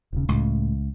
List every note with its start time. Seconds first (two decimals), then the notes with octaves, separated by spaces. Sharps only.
0.13 D#1 C#3
0.29 C#2 A2